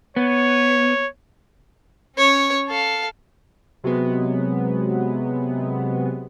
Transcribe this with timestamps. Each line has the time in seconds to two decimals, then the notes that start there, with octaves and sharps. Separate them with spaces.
0.16 B3 C#5
2.16 C#4 C#5
2.68 A4 F5
3.84 C3 F#3 G#3 B3